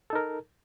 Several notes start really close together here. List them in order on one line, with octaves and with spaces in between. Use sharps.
A4 D#4 A#4